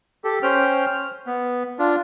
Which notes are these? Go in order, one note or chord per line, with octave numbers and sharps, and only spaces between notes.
G4 A4
C#4 C5 G5 F6
F6
B3
D4 F4